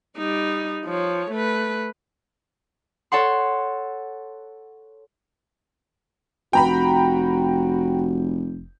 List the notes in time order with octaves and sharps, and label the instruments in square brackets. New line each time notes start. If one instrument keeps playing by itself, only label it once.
[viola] G3 D#4
F3 C#5
A3 B4
[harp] A4 C#5 F#5 C6
[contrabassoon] F1 [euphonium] F#4 [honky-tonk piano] G5 A#5 B5